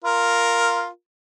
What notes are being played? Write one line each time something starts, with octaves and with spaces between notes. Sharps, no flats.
F4 A#4